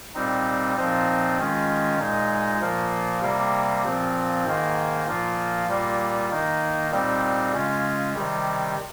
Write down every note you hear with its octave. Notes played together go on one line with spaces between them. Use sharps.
A#2 G3 C4 D#4
A#2 F3 C4 D#4
D#3 G#3 C#4 F4
A#2 G#3 D#4
A#2 F3 A#3
C3 G3 A#3
A#2 F3 C4
G#2 D#3 A#3
A#2 F3 A#3 F4
A#2 G3 A#3 F4
D#3 A#3 D#4
A#2 G3 C4 D#4
C#3 G#3 C#4 F4
C3 D#3 G3